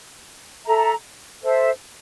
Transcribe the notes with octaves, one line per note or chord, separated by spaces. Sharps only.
A4 E5 A#5
A4 C5 E5